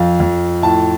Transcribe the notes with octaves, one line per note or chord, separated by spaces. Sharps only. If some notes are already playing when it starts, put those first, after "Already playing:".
Already playing: F2 F5
F2
A2 A5